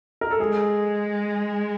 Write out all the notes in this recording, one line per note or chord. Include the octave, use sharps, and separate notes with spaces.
A#4
A4
G#3 G#4